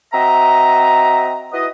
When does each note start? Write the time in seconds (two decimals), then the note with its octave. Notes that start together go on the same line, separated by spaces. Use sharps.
0.13 C4 F#4 D#5 E5 A#5
1.52 E4 F#4 B4 D#5